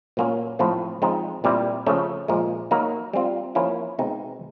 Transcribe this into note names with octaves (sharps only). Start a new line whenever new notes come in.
A#2 F#3 A#3 C#4
A2 F3 A3 C4
F3 G#3 C4 D#4
A#2 G3 C4 E4
C#3 F3 A3 C#4
A#2 F3 G#3
F#3 A#3 D#4
G3 C4 F4
F3 A#3 C#4 E4
B2 G#3 C4 D#4